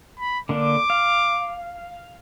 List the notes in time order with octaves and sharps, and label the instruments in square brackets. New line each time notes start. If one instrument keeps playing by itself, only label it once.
[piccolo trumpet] B5
[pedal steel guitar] D3 A#3 D4 [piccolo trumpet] D6
[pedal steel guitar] F5